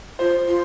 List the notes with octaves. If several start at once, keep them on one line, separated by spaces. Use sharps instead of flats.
F4 C5
F4